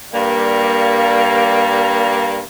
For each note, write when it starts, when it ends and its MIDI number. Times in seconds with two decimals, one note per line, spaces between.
0.14 2.40 43
0.14 2.40 55
0.14 2.40 58